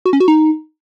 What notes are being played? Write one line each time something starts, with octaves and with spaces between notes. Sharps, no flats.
F#4
C#4
F#4
D#4